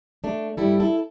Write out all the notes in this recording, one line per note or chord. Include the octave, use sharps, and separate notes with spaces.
A3 D4
G2 G3 E4 A4
E4 A4